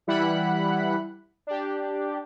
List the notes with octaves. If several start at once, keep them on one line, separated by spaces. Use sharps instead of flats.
E3 G3 E4 F#5 B5 F#6
D4 G4